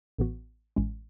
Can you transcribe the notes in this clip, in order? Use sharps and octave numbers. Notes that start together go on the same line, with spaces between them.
A1 A2 E3 B3 F#4
A1 A2 G#3 C#4